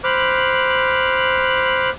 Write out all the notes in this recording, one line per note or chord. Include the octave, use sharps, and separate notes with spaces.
C5 B5 D6 F6 F#6